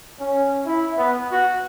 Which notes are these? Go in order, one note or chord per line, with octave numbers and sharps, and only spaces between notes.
C#4
E4
B3
F#4